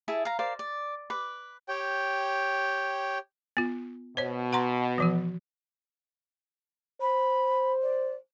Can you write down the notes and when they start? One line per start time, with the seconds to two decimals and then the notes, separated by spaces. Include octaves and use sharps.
0.08 E4 G#4 E5 A5
0.25 F5 A#5
0.39 A#4 C5 D5 F5
0.59 D5
1.10 B4 D6
1.68 G4 C#5 G5
3.57 B3 F4
4.17 B2 C5 C#5
4.53 F#5 A#5 C6
4.98 E3 F3 F#4
7.01 C5 B5
7.82 D5